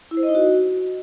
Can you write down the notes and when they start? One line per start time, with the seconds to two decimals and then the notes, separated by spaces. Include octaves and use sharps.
0.11 E4
0.17 C5
0.23 D#5
0.29 D#4
0.35 F#4